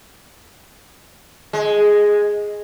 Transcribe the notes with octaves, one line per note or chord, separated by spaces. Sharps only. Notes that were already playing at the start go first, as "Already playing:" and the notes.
G#3